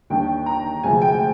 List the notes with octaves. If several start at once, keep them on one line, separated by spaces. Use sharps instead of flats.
D#2 D#3 G3 D4 G5
A#5
D2 C3 F3 G#3 G#5
G5